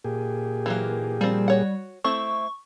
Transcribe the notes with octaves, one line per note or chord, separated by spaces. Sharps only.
A#2 G4 G#4
E3 F#3 A#3
F3 G3 C4
F#4 C#5 F#5
A3 C4 E4 C#6